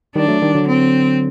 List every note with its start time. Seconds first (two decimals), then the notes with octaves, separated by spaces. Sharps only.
0.15 D#3 G3 D4
0.28 F#3 A3
0.42 D#3 G3
0.55 D3 F#3
0.67 C4